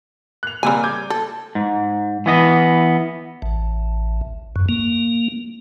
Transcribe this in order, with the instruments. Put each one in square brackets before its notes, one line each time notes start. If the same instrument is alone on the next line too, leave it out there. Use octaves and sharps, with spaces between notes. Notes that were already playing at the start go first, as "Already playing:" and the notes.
[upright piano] F#6 F7
[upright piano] C#3 A#3 [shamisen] G3 C4 G#5
[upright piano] D6 G6 G#6
[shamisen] A4
[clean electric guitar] G#2
E3 B3 D#5
[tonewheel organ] A1
F#2
A#3